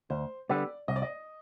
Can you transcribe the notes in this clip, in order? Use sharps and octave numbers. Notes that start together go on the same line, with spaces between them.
D2 C5
D3 G3 B3 D5
C2 D#5
D5
D#5